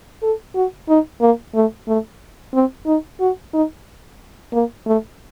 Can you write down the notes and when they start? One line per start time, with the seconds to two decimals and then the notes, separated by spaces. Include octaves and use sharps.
0.23 A4
0.55 F#4
0.89 D#4
1.21 A#3
1.55 A3
1.88 A3
2.54 C4
2.87 D#4
3.20 F#4
3.54 D#4
4.53 A#3
4.86 A3